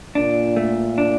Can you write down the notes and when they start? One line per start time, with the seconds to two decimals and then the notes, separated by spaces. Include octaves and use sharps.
0.15 A#2 D4
0.56 A3
0.98 D4